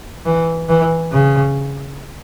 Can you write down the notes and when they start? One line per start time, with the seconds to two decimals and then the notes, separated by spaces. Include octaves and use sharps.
0.25 E3
0.69 E3
1.12 C#3